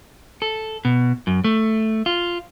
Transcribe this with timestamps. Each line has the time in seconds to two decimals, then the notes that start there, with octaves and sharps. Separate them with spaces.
0.42 A4
0.85 B2
1.27 F#2
1.44 A3
2.06 F4